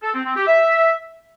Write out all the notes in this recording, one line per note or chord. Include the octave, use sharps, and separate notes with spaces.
A4
C4
C4
G4
E5